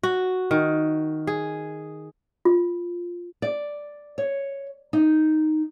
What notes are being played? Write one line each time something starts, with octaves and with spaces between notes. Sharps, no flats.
F#4
D#3
G#4
F4
D5
C#5
D#4